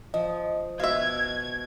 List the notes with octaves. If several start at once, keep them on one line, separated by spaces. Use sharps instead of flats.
F3 D#5
B2 E5 F5 G#6